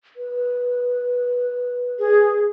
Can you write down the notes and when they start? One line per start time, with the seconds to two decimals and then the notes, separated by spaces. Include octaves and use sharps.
0.17 B4
2.00 G#4